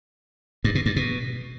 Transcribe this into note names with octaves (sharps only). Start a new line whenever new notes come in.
G2
B2
G2
B2